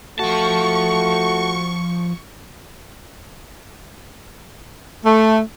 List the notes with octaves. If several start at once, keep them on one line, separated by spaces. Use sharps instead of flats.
F3 A3 F#4 A5 C#6
A3